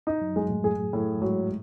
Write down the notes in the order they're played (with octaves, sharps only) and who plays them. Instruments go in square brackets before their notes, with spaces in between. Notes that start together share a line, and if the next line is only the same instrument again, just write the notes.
[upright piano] D#4
[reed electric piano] F#2 F#3
[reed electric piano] F#2 F#3 [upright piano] G#3
[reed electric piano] A2 A3
[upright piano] G#4
A2
[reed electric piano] G#2 G#3 [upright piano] F#3